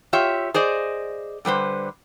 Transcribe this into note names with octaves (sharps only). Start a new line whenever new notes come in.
F4 G4 C#5 E5
G#4 C5 D5 D#5
D3 G3 B4 C5